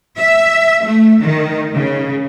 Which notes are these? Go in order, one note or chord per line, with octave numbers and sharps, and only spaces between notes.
E5
A3
D#3
C#3